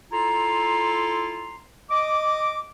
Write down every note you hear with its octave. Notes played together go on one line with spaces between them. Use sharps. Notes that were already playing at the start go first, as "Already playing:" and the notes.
E4 F4 A4 A#5 C6
D#5 D6